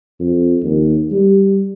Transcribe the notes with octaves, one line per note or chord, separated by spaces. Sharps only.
F2
D#2
G3